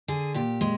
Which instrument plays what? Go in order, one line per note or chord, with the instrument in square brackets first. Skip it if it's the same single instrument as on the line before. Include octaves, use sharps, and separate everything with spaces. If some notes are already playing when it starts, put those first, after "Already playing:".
[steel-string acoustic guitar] D3 G#4
A#2 G4
G#3